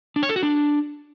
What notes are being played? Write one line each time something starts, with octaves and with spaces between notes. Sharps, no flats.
D4
C#5
A4
F#4
D4